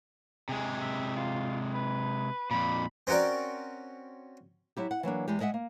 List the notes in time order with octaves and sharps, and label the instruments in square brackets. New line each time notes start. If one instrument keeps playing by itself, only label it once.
[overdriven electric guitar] C3 G#3 [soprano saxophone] G#4
[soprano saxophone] E5
F4
B4
[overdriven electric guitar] F2 A#2 [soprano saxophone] B5
[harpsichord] C4 C#4 F#4 A#4 D5
[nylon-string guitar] F#3 E4 G4
F#5
E3 F#3 A#3 D4
E2 E3 G#3 G4
G#3 D#5 E5 F#5
A#3